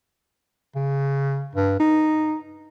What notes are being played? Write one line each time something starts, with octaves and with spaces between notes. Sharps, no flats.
C#3
G2
D#4